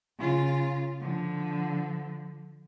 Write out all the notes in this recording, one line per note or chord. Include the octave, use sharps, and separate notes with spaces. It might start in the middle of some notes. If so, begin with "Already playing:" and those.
C#3 F4
D3 F3